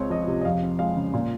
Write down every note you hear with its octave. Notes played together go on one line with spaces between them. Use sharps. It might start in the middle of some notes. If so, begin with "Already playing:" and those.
Already playing: C#2 G#3 C4 C#5
F3 D#5
C3
D#5
F2 F5
C4
G#3 F5
C#3
A#2